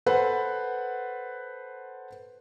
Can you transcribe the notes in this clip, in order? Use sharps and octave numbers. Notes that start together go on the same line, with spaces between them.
A4 B4 C5 F#5